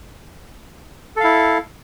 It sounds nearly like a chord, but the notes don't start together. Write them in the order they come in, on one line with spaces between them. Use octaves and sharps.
A4 F5 E4